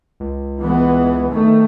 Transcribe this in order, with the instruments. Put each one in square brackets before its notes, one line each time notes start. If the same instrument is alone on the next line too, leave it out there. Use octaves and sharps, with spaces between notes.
[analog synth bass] C#2
[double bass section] E3 G#3 B3
D#3 A3